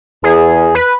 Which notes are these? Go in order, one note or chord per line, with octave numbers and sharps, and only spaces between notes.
E2 G#4
B4